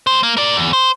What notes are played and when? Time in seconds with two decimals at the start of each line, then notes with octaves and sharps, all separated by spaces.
0.07 D2 C5
0.23 A#3
0.37 A#4 D5
0.56 E2
0.73 C5